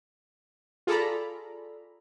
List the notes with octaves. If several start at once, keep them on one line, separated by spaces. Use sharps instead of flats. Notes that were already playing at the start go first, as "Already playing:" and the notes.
F4 G#4 A4 D5 A#5 B5